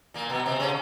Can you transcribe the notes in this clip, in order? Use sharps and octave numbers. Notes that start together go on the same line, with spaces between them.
A#2 A#3
B2 B3
C3 C4
C#3 C#4